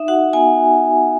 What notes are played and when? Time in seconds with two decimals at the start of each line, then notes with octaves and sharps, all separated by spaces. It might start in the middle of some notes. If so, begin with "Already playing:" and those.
Already playing: D#4 E5
0.08 F#4 F#5
0.33 B3 G#5